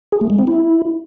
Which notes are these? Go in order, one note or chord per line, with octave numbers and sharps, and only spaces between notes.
G#4
A3
G#3
C4
E4